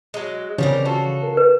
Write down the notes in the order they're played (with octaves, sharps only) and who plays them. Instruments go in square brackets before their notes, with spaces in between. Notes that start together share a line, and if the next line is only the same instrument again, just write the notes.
[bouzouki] F#3 G#3
[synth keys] C#3 [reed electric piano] E3 [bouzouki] G3 C4 A#4
[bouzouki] F4 F#4 A4
[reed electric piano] A#4
[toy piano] B4